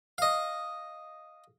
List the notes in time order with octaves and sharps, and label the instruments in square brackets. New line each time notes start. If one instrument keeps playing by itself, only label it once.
[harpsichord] D#5 F5